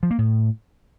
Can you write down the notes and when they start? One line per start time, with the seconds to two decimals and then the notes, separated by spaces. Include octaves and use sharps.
0.03 F3
0.11 A#3
0.18 A2